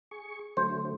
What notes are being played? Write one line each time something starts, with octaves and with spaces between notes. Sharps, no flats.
G#4 C#6
D3 F#3 A3 C5